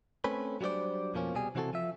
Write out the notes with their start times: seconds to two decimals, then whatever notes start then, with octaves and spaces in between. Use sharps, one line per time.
0.24 A3 C4 C#4 B4
0.61 F#3 G3 D4 F4 C5 D5
1.14 F2 B2 F3 A#3 C#4
1.34 C2 B2 G3 G#4 G#5
1.55 C3 E3 C4 F#4 G4 A4
1.73 F3 E5